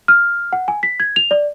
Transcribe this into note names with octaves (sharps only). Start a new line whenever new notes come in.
F6
F#5
G#5
B6
G#6
F7
D5